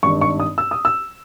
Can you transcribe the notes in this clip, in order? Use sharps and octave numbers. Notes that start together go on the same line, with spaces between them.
G#1 G2 D#3 C#6
C#6
D#6
E6
D#6
E6